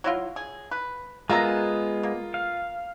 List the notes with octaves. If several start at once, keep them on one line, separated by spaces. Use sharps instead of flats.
F#3 E4 F4
G#4
B4
G#3 B3 F4 A#4 E5 A#5
A#3
F5